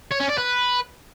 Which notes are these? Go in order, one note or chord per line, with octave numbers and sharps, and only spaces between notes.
C#5
C#4
D5
B4